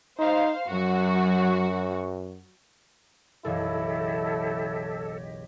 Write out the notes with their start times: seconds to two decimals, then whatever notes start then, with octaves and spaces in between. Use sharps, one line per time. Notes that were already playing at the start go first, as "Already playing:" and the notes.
0.19 D#4 C5 F5
0.68 F#2 F#3 F#4
3.45 F#1 B1 E3 E4 G4 A4 C#5 D#5